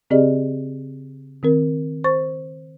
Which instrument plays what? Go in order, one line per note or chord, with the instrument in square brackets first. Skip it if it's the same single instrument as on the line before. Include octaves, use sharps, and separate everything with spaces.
[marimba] C#3 C4 G4 G#4 D5 D#5
D#3 C4 A#4
C5 C#6 A6